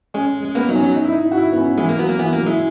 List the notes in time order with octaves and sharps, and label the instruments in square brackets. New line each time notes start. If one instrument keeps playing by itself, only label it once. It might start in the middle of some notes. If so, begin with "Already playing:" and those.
[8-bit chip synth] G#3 [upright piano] C#4
[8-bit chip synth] G#3
[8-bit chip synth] A#3 [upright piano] B3
[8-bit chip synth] F#3 [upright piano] D#4
[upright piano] C#4
[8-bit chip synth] F#3
[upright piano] D#4
E4
D#4
F#4
E4
B3
C#4
[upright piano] E3 [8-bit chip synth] G#3
[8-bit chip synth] A#3
[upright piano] F#3 [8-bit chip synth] B3
[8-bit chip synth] A#3
[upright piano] E3 [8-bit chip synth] B3
[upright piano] F#3 [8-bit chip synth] A#3
[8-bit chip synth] G#3 [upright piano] E4